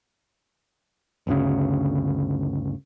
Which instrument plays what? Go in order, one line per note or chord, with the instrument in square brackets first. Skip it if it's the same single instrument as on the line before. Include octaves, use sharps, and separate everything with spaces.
[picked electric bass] G1 D2 C#3